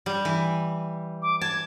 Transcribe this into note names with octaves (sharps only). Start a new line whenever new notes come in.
G3
E3
D6
A5 G#6